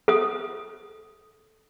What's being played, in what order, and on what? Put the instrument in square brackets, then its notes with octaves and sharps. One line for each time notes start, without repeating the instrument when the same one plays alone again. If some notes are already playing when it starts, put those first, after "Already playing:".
[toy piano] A4 D#6